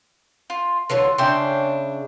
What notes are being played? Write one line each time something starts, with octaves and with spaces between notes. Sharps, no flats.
F4
D3 E3 F#3 F4
C#3 D4 E5 G5 C6